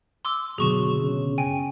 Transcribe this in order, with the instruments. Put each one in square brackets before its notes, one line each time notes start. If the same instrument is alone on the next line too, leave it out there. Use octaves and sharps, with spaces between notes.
[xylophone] C6 D6 E6
[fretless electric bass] F#1 B2 D3 [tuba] F#3 [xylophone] G#4 C#6 E7
[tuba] C#3
[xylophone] G5 G#5